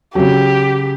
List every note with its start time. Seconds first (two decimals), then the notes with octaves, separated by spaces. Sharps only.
0.15 C#3 F#3 G4